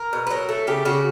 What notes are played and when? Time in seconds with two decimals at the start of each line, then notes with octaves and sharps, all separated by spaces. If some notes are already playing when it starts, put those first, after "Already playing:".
Already playing: A#4
0.13 B2
0.27 B4
0.30 F#3 A#4
0.49 A3 A4
0.67 C#3 G4
0.85 C#3 F#4